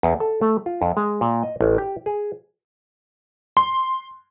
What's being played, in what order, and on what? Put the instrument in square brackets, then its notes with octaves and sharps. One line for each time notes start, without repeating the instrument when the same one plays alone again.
[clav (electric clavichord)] E2
A4
A3
F4
F2
G#3
A#2
D#5
A1
G4
G#4
[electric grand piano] C6